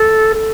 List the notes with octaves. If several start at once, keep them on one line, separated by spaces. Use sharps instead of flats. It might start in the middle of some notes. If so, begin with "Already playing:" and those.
Already playing: A4
A4